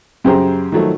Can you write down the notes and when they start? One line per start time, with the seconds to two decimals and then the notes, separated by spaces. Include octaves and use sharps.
0.24 F#2 C#3 G4 G#4 C5 A#5
0.72 D#3 F3 F#3 A3